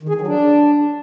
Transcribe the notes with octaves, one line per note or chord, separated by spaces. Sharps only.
D#3
G#4
D#3
F#3
D4